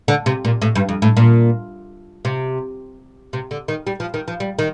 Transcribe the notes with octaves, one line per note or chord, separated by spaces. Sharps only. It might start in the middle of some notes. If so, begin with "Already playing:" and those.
D3
C3
A#2
A2
G2
F2
A2
A#2
C3
C3
D3
D#3
G3
F3
D#3
F3
G3
D#3